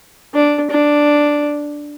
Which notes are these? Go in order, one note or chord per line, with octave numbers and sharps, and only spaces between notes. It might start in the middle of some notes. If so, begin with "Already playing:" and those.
D4
D4